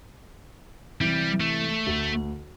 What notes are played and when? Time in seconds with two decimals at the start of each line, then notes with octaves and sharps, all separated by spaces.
1.01 C3 E3 G3
1.40 A3
1.86 D2